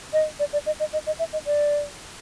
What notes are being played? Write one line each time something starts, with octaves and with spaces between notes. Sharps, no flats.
D#5
D5
D5
D#5
D#5
D#5
D#5
E5
D#5
D5